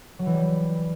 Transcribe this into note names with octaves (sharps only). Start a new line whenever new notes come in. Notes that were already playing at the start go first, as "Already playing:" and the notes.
F#3
E3
G3